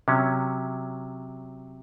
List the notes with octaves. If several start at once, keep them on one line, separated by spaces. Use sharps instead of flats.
C3 F#3 C#4